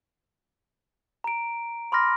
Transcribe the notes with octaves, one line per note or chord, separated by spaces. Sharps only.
A#5 D7
B5 C6 D6 F6 A#6